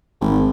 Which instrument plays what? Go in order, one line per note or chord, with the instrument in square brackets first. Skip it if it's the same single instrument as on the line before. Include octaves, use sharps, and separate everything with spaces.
[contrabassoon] G#1